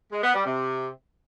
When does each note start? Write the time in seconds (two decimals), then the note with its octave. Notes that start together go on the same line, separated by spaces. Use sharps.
0.11 G#3
0.23 B3
0.34 G3
0.46 C3